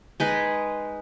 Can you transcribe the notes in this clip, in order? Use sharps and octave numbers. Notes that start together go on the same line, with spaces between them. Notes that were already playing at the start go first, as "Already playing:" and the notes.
G#3 D#4 G#4 B4